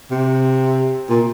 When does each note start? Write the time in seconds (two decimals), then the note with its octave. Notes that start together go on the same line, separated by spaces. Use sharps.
0.11 C3
1.09 A#2